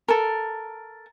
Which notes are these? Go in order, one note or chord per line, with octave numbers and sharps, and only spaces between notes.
A4 A#4